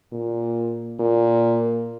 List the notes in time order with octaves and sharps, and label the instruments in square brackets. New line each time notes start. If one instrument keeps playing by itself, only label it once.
[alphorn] A#2
A#2